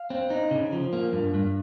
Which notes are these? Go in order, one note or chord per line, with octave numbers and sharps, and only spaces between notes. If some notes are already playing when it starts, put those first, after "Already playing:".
Already playing: F5
C4
D#4
C#3
F3
A#3
G2
G2